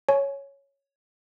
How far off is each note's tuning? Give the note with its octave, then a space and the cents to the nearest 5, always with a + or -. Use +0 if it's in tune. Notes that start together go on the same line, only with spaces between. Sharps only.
C#5 +0 G#5 +30